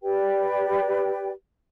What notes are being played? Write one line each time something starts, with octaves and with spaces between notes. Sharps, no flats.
G4 B4 D5 G5